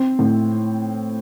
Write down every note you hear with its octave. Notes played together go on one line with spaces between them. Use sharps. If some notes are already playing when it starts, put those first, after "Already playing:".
Already playing: C4
A2